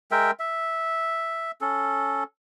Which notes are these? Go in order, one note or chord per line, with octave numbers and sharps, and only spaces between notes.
G#3 A#4 E5 G5
E5
C#4 A4